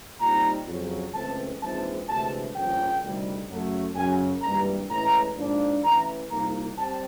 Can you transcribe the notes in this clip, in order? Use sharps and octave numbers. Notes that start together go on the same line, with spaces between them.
A#2 G3 C4 D#4 A#5
F2 C#3 F#3
C#2 C#3 E3 A3 C4 A5
A#1 G#2 E3 G#3 C4 A5
D2 C3 E3 G#3 A5
G1 F2 C#3 F3 A#3 G5
D2 C3 D#3 G3
F#2 C#3 F#3 A3
F#2 C#3 F#3 G#5
G#1 G2 E3 G3 A#3 A#5
A2 E3 G#3 C#4 A#5
G#2 F3 A#3 D4
A1 A2 E3 A#5
C2 A#2 F3 A#3 D#4 A#5
G3 C4 A5